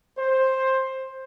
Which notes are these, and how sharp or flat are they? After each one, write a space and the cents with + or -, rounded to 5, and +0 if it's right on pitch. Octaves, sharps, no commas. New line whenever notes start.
C5 +10